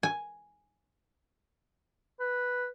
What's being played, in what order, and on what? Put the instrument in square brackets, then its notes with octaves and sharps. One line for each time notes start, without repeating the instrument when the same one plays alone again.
[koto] G#5
[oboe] B4